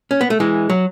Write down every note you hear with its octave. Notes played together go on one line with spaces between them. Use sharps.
C#4
B3
A3
E3 G#3
F#3